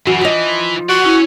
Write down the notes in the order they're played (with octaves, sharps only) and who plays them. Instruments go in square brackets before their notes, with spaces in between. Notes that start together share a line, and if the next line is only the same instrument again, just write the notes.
[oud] F#2 E3 F#4 [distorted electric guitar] C#3
[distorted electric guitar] E3 [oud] F3 D#5
[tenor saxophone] F#4 [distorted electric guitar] D5 F#5
[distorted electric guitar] C#4 C#5 [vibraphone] E4